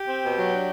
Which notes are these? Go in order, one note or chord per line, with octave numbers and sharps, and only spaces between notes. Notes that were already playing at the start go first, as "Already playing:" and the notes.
Already playing: G4
C4
B2
F#3
D4